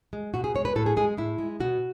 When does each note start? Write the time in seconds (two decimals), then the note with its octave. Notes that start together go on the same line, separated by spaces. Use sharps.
0.13 G#3
0.34 B2 F#4
0.44 G#4
0.55 G#3 C#5
0.65 B4
0.76 A2 A4
0.86 G#4
0.97 G#3 G#4
1.18 A2 E4
1.38 G#3
1.60 B2 F#4